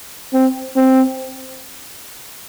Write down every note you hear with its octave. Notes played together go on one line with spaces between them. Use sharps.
C4
C4